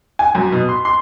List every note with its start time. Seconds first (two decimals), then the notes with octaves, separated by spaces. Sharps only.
0.19 G#5
0.35 F#2
0.52 B2
0.69 C6
0.85 C6